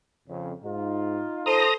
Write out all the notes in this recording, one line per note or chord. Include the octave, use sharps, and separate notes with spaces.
F2 C#3
G#2 D#4 F4
A4 C5 A#5 D#6